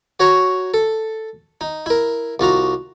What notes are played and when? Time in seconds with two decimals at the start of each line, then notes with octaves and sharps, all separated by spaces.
0.20 F#4 C#5 A#5 C#6
0.74 A4
1.61 D#4
1.86 E4 A#4
2.40 C2 F4 F#4 A#5